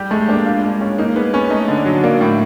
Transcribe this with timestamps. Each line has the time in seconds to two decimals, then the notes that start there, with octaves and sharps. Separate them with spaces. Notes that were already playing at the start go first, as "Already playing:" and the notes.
Already playing: G3 G4
0.11 G#3 A3
0.28 A#3 D4
0.46 F4
0.63 G#3
0.81 C#4
0.98 A#3 D#4
1.16 G#3 B3
1.33 B3 C#4
1.50 A3 D#4
1.68 D3
1.78 D4
1.86 F#3
2.03 A#3 D4
2.21 A2